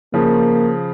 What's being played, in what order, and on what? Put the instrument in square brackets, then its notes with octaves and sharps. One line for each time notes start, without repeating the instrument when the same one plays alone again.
[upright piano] C#3 F3 [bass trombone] A#3